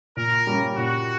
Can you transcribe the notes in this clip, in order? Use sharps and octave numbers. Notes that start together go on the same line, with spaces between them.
A#2 A#4
G3 A#3 C#4
A#2 F#4